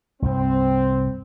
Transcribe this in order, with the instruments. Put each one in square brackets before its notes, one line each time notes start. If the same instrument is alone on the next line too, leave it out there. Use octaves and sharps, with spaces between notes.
[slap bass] C2 G2 [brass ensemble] C4